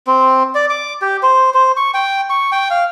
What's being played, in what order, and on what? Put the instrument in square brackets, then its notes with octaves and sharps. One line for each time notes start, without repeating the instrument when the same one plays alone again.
[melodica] C4
D5
D6
G4
C5
C5
C#6
G5
C#6
G5
F5